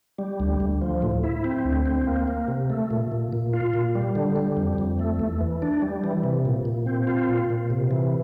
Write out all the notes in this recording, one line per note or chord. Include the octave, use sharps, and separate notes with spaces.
G3
D2
D2
F3
A2
E4
C4
D2
C4
A#3
A#3
C3
A3
A#2
A#2
A#2
F4
A#2
G3
D3
G3
F2
F2
A3
E2
E3
D4
G3
E3
C3
A#2
A#2
C4
F4
A#2
A#2
C3
E3